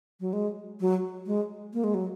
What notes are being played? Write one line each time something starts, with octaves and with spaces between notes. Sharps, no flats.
F#3
G#3
F#3
G#3
A#3
G#3
F#3